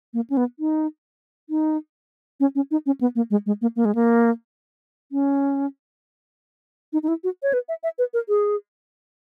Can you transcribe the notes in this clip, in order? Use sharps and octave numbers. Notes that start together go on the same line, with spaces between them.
A#3
C#4
B3
D#4
D#4
C#4
C#4
D#4
C#4
B3
A#3
G#3
G#3
A#3
A#3
G#3
A#3
C#4
D#4
D#4
E4
F#4
C#5
B4
E5
E5
B4
A#4
G#4